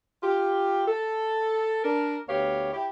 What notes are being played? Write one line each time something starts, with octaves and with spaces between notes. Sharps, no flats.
F4 G4
A4
D4 A#4
D2 B3 G4 C#5 F5
E4 G4